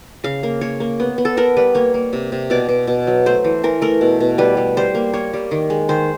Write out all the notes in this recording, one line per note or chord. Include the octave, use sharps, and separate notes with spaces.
C#3 F5
A#3
A#3 C#5
A#3
B3
B3
A4
B3 A#4
G3 B4
A#3 C#5
A#3
C3
C3
B2 D5
B2
B2
F#3
A3 C5
E3
E3 A#4
A3 A#4
B2
B2
G3 B4
G3
G3 C5
A#3
A#3 C#5
G3
D#3
G#3
D#3 C5